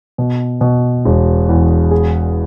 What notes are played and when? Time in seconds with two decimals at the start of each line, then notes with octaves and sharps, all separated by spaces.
0.18 B2
0.61 B2
1.05 E1
1.49 E2
1.91 G#4